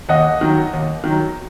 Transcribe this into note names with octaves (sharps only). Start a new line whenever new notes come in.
D#2 D#5 F#5
D#3 F#3
D#2
D#3 F#3